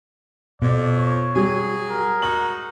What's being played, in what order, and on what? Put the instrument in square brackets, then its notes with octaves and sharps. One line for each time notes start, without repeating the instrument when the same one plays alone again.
[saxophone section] F2 [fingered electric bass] B2 [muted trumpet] D5
[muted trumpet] C#5
[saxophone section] F#3 G#4 [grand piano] G3 G4
[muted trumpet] A#4
[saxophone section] G#3 D#4 F#4 [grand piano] F#7